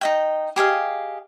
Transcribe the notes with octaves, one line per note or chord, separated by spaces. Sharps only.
D#4 D#5 G5
G4 G#4 D#5 F5